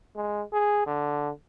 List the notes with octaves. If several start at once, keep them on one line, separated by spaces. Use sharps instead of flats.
G#3
G#4
D3